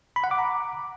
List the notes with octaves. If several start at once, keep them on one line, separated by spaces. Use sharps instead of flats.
B5
F#5
D6
A#5